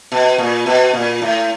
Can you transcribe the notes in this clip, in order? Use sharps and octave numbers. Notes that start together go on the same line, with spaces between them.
B2
A#2
B2
A#2
A2